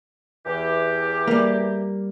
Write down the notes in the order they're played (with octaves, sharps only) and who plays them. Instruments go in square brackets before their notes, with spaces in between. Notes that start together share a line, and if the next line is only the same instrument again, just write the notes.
[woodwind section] E2 E3 G4
[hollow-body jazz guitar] G3 A#3